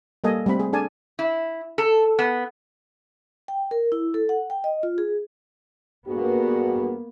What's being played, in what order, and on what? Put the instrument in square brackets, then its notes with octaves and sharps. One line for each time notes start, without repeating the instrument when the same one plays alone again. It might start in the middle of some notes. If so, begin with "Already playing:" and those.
[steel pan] G3 A#3 A4 D#5 G#5
G3 A3 C4 B5
G#4
D4 G#4 A4 D5 G#5 A5
[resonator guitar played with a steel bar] E4
A4
B3
[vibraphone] G5
A#4
E4
A4
F#5
G5
D#5
F4
G#4
[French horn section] G2 F#4 G#4 [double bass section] A#3 B3